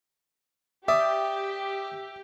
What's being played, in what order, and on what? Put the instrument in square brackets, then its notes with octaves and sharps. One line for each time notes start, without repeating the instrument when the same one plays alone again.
[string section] G4 [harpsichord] D5 D#6 [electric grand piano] E5